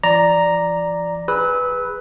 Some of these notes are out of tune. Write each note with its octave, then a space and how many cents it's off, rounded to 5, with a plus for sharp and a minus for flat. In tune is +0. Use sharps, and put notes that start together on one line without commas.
F3 -45 D5 +0 A#5 +0
G#4 -15 B4 +0 E6 -25